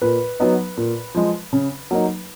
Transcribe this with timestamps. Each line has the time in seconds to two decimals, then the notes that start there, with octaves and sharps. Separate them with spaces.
0.02 A#2 B4
0.40 F#3 B3 D#4
0.77 A#2
1.15 F3 G#3
1.53 C#3
1.91 F#3 A#3 D#4